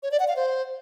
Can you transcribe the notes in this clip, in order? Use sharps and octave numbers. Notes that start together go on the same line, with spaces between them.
C#5
D5
F#5
F5
C5